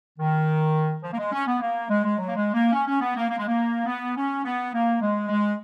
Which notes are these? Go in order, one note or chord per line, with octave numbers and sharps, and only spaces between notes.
D#3
F3
A#3
G#3
C#4
B3
A#3
G#3
G#3
F#3
A#3
G#3
A#3
C#4
C#4
B3
A#3
A#3
G#3
A#3
B3
C#4
B3
A#3
G#3
G#3